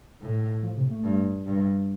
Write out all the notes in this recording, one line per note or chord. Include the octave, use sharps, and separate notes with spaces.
A2
F3
C3
A3
G2
G2